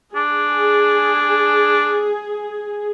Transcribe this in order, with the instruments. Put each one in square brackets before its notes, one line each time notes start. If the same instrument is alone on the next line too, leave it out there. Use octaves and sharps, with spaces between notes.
[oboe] D4 [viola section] G#4